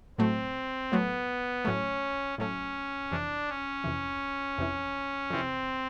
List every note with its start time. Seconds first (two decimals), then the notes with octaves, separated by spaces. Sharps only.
0.18 A2 F#3 A3 C4
0.92 A2 F#3 A3 B3
1.65 A2 F#3 A3 C#4
2.38 A2 F#3 A3 C#4
3.11 F2 C3 E3 D4
3.48 C#4
3.84 F2 C3 E3
4.58 F2 C3 E3
5.31 F2 C3 E3 C4